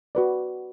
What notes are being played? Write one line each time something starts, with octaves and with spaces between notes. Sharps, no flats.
F#4 B4 D5